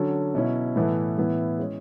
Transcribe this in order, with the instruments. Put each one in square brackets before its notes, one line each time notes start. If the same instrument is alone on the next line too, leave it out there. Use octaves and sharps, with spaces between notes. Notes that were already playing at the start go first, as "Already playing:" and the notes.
Already playing: [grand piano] D3 F#3 C#4 F#4 A4
B2 F#3 C#4 E4
A2 E3 B3 E4 A4
A2 E3 B3 E4
G#3 C#4 G#4